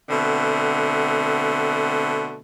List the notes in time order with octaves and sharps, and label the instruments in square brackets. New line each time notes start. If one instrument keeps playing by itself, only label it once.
[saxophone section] B2 D3 A3 C4